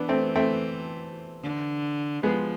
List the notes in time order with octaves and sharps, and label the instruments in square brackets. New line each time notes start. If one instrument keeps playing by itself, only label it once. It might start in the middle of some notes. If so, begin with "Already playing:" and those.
Already playing: [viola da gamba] E3 [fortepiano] B3 D4
[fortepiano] A3 C4
A3 C4
[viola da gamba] D3
[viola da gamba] F3 [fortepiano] G#3 B3